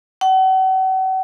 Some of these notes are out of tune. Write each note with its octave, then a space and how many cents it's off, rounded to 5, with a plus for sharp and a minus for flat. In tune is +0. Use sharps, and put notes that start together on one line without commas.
F#5 +40